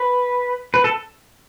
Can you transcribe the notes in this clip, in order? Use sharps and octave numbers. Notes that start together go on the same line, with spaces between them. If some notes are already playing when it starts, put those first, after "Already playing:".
Already playing: B4
B4
A4